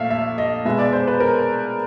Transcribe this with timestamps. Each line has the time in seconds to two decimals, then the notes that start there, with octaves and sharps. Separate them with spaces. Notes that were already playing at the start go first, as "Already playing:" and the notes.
Already playing: A#2 F3 A3 E5 F5
0.10 E5
0.38 D#5
0.65 B2 G#3 B3 E5
0.79 D5
0.93 C5
1.07 B4
1.20 A#4